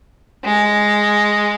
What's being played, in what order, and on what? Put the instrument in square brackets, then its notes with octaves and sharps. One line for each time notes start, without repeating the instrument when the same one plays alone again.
[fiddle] G#3